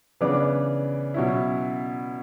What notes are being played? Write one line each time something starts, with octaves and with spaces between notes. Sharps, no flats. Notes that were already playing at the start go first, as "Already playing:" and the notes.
C#3 E3 B3 D4 D6
B2 F#3 C#4 E4